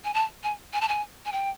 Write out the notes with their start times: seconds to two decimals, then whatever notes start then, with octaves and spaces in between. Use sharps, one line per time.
0.04 G#5
0.14 A5
0.43 G#5
0.73 G#5
0.81 A5
0.88 G#5
1.25 G#5
1.32 G5